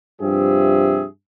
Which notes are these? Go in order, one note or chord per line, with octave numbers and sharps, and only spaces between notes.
G2 C3 F3 G4 G#4 E5